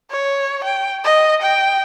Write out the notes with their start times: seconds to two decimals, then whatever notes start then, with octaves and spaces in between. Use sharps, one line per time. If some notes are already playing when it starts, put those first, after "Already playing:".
0.11 C#5
0.64 G5
1.04 D#5
1.42 G5